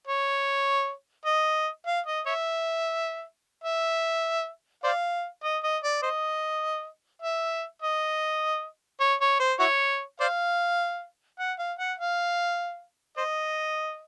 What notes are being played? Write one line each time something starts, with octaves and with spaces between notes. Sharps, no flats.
C#5
D#5
F5
D#5
C#5 E5
E5
C5 D5 F5
D#5
D#5
D5
C5 D#5
E5
D#5
C#5
C#5
C5
E4 F#4 C#5
C5 D5 F5
F#5
F5
F#5
F5
C5 D#5